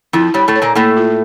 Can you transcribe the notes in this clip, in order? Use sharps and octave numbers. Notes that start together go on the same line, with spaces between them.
F2 F3 E4
G2 G3 C#5
A2 A3
C#5
A#2 A#3
A2 A3 A#3
F4